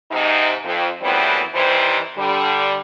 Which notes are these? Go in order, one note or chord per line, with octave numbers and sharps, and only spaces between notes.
G#2 C3 D#4
F2
F#2 A2 E3 G3 B3 C4
C3 D#3 E3 G3 C5
D3 G3